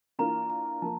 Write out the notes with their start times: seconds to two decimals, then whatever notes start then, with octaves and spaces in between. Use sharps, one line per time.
0.19 E3 A#3 D4 F4 A#4 A#5
0.50 A#5
0.82 F3 A#3 A5